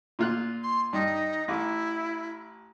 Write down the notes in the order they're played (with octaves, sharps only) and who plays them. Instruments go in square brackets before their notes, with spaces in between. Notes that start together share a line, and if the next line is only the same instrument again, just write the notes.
[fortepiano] A#2 F4 F#6
[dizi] C6
[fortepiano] G2 [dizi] D#4
[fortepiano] A1 [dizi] E4